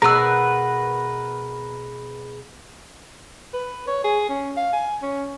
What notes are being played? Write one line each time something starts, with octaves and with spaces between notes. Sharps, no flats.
B2 F#4 G#4 A#4 B4 A#5 E6 F#6
B4
C#5
G#4
C#4
F5
G#5
C#4